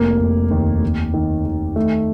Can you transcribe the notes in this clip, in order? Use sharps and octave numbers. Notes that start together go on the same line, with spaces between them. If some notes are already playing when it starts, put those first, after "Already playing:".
Already playing: F1 A#3
F1
D#2
D#2
D#3
D#3
D#3 A3